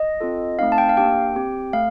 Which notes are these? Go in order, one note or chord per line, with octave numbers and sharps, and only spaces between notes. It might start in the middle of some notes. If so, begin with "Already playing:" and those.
Already playing: D#5
C4 F4 A4
A3 C4 D#4 F5
A5
G5
F5
A#3 D4 G4 G5
C4 G4
A3 F5